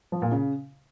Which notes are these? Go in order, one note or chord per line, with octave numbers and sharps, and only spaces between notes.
F3
A#2
C#3